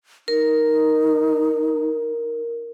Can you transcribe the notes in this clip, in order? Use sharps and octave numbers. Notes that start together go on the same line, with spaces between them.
D#4 A#4